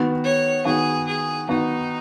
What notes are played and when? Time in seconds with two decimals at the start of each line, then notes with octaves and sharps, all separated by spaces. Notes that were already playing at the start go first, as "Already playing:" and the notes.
Already playing: D#3 B3 F#4
0.24 C#5
0.65 D#3 B3 F#4 G#4
1.07 G#4
1.48 D#3 B3 D#4 F#4